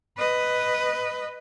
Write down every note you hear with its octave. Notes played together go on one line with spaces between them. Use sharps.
B4 D#5